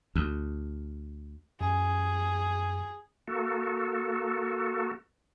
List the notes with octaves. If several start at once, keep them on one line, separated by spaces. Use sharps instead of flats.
D2
F#2 G#4 G#5
A#3 F#4 A4